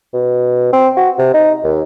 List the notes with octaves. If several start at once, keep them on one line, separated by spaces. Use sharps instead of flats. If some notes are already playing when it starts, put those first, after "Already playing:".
B2
C4
F#4
C3
D#4
D#2